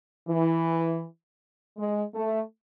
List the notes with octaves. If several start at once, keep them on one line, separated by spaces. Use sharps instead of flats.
E3
G#3
A3